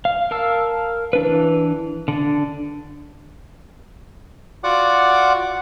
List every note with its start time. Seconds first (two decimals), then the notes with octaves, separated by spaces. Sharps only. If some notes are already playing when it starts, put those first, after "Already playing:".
0.05 F5
0.31 A#4 F5 A5 E6
1.13 E3 D4 B4
2.08 D3 D4
4.64 F4 F#4 D5 F#5 D6